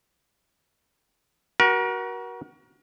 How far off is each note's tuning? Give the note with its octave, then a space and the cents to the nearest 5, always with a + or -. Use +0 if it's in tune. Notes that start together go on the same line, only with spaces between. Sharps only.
F#4 +15 A#4 +35